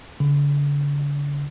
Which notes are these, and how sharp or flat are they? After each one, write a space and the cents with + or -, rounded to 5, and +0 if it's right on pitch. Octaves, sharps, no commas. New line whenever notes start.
D3 -40